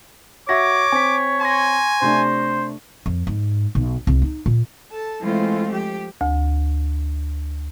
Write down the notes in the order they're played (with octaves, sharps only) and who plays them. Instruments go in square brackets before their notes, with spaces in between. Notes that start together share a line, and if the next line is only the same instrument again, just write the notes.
[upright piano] F#4 E5 F#5 [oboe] C#5 [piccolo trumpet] D6 [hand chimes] A#6
[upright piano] C4 [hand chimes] G#5 B6
[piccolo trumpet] G#5 [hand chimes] C6 C#6 A#6
[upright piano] C3 A3 D4 [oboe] C5
[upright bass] F2
G#2
B1
C2
D#4
A#2
[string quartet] A4 A5
E3 G#3 A3 C4 F4
F3 G4
[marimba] D2